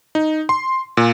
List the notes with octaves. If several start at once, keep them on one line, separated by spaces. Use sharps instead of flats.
D#4
C6
A#2